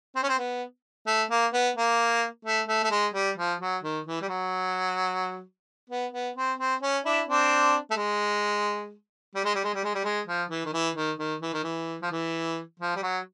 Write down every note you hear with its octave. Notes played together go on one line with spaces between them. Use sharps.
C4
C#4
C4
B3
A3
A#3
B3
A#3
A3
A3
A3
G#3
G3
F3
F#3
D#3
E3
G3
F#3
B3
B3
C4
C4
C#4
D4 E4
C4 D4
A3
G#3
G3
G#3
G3
G#3
G3
G#3
G3
G#3
F3
E3
D#3
E3
D#3
D#3
E3
D#3
E3
F3
E3
F3
G3
F#3